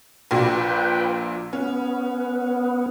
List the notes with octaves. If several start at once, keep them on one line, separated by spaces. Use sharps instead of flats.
A#1 A#2 B4 G5
B3 C#4